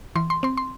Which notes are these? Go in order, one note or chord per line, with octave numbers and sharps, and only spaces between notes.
E3 C6
C6
C4 C6
C6